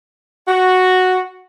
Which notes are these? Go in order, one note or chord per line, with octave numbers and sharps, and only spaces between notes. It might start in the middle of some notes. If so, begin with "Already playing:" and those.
F#4